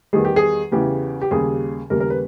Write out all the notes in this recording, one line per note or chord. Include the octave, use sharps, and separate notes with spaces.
E2 D#3 G3 G#4
G4
G#4
E2 C#3 E3 G4
G4
D#2 C#3 G3 G#4
D#2 C#3 G3 A#4
A#4
B4